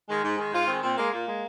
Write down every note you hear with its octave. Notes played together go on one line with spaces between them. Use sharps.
D#3 G#3
G#2
D#3 G#3
G#2 F4
D#3 G#3 C4
A#2 C4
G#3 A#3
A#2 A#3
G#3